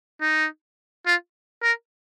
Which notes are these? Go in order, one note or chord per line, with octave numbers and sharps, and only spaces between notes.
D#4
F4
A#4